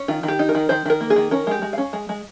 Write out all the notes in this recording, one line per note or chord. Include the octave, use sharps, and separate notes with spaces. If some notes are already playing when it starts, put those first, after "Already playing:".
Already playing: C#4
D#3 F4
D#3
G4
D#4
A#4
D#3
D#3 C5
D#3 A#4
A#3
G#4
D#3
C#4 A#4
G#3 G4
G#3
C#4 F5
G#3
G#3